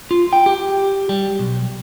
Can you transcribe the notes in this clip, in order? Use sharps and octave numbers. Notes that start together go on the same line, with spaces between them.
F4
G5
G4
G3
B1